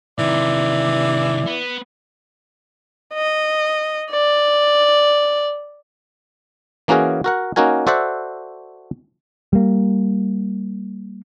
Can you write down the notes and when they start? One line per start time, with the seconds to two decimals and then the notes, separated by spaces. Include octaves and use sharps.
0.19 C3 D#3 E3 D5
1.46 B3
3.14 D#5
4.11 D5
6.88 E3 A#3 C#4 F#4 G#4 A#4
7.24 F#4 A#4 F#5
7.56 A#3 C#4 D#4 F#4 A#4 G#5
7.87 F#4 A4 C5 D5 E5 F#5
9.53 G3 A#3